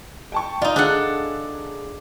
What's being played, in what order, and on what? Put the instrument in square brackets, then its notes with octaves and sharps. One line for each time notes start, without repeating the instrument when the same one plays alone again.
[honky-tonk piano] G5 A5 C#6
[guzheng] D#4 F4 [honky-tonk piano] D5
[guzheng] D4 A4 F#5 [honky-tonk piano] G#4